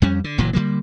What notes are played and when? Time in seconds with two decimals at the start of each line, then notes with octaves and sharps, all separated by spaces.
0.02 F2 G3 C#4
0.24 D3
0.38 F#1 A#2 E3 F#3
0.53 D3 F3 G3 A#3